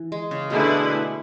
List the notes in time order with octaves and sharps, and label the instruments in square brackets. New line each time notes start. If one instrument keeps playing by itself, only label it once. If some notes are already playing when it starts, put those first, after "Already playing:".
Already playing: [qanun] E3
G#3
C#3
[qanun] B2 [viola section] D3 A3 E4 G#4 B4